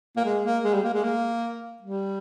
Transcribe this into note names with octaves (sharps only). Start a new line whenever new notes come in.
A#3
G#3
A#3
G#3
G3
A#3
G#3
A#3
G3